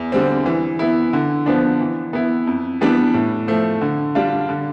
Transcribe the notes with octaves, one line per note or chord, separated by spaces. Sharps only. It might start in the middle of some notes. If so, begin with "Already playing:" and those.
Already playing: E2
D3 G3 C4
E3
B3 E4
D3
F3 B3 D4
E3
B3 E4
F2
E3 G3 B3 D4
A2
F3 A3
D3
G3 D4 F4
D3